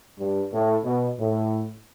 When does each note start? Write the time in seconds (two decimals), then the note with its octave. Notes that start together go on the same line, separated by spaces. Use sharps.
0.19 G2
0.53 A2
0.85 B2
1.19 A2